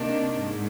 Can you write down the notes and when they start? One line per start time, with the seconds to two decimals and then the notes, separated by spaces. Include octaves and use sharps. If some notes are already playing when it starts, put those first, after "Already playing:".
Already playing: C3 D#3 A#3 D4
0.37 G#2